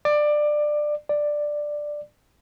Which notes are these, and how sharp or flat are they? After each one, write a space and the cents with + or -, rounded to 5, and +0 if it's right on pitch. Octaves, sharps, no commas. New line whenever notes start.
D5 +20
D5 +10